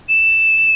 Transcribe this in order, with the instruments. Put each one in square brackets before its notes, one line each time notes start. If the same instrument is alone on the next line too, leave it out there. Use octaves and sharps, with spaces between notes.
[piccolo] E7